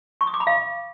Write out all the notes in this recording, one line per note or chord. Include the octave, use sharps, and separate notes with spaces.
C#6
D#6
D6
B5
F5